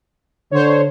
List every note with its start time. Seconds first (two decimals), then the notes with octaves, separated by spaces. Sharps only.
0.51 D3 C5 C#5